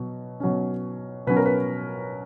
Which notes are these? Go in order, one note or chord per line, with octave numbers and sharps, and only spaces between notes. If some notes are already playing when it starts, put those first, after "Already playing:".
Already playing: B2 F#3
B2 F#3 C#4
B2 F#3 C#4 B4
A#4
B4